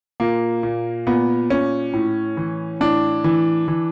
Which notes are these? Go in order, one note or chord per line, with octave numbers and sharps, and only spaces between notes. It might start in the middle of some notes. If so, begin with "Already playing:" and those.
A#2 A#3
A#2
A#2 B3
A#2 C#4
A2
E3
A2 D4
E3
E3